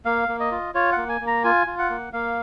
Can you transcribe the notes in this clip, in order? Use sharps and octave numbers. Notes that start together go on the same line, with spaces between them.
A#3 F5
A#3
D#5
F4
F4 C#5
A#3 F#5
G#5
A#3
A#5
F4 G#5
F4
F#5
A#3
A#3 F5